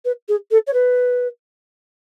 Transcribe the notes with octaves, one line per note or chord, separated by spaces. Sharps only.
B4
G#4
A4
C#5
B4